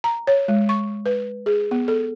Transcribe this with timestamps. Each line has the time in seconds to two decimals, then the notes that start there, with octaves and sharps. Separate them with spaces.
0.04 A#5
0.27 C#5
0.48 G#3
0.69 C#6
1.06 B4
1.46 G#4
1.71 B3
1.88 A4